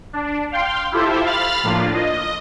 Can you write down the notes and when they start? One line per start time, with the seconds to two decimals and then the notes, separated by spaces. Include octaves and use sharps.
0.13 D4
0.52 F5 G5 C6
0.92 E4 F4 G4 A4 C5 E5
1.25 F5 B5 F6 A6
1.64 A2 F3 A#3 D4 F4
1.94 D#5